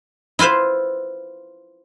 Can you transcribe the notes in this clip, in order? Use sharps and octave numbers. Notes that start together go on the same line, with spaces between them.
E4 F4 B4 C5 F5